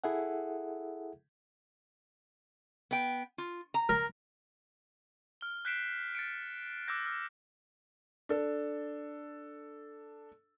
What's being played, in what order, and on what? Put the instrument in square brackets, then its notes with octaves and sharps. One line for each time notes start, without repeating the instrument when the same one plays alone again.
[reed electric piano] E4 G#4 A4 E5 F#5
[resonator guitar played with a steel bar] B3 G5
F4
A#5
[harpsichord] A#4
[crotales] F6 G7
F#6 G6 B6 C7 D7 E7
A6 C#7 D7
D6 E6 F#6 G6 A#6
E6 F6
[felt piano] D4 A4